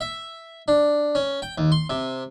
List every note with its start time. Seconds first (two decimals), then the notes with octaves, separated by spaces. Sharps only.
0.01 E5
0.68 D4
1.15 C#4
1.42 G5
1.58 D#2
1.72 C6
1.90 C3